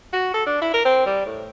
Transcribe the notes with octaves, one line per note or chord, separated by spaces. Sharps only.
F#4
A4
D4
E4
A#4
C4
G3
A2